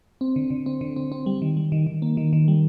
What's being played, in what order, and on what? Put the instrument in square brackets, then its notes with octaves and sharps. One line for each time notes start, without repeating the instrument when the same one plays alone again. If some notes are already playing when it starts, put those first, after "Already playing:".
[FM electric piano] C4
D3
D3
C4
D3
C4
C4
G3
D#3
G3
D#3
D#3
A#3
D#3
D#3
G3